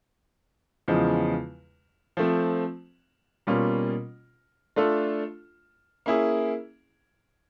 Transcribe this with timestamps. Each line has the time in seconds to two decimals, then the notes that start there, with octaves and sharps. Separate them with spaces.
0.88 E2 C#3 F3 G#3
2.17 F3 A3 C4
3.47 B2 G3 A#3 C#4 F4
4.76 A3 D4 F4 A4
6.06 A#3 C#4 E4 G#4